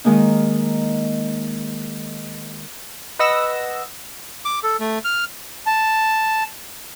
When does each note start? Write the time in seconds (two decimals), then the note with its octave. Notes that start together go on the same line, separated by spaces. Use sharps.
0.04 D#3 G#3 A#3 D#4
3.19 B4 D#5 F#5 E6 A#6
4.45 D6
4.64 A4
4.80 A3
5.05 F6
5.66 A5